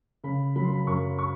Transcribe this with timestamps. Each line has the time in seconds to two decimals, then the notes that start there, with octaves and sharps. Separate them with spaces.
0.24 C#3 B5
0.56 F#3 B5
0.64 C6
0.73 B5
0.87 F#2 C#6
1.19 C#6